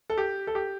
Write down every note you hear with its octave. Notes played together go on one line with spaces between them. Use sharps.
A4
G4
A4
G4